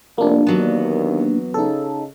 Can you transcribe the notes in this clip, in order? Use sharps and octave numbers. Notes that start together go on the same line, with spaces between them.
F1 A#3 D4
D#2 E3 F#3 B3
C#3 D#4 A4